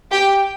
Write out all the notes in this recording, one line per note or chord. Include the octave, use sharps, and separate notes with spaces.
G4 G5